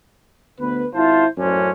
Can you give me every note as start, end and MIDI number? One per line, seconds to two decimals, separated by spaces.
0.60 0.86 38
0.60 0.86 59
0.60 0.86 71
0.93 1.25 32
0.93 1.25 64
0.93 1.25 65
0.93 1.25 72
0.93 1.25 81
1.38 1.71 42
1.38 1.71 45
1.38 1.71 61
1.38 1.71 62
1.38 1.71 72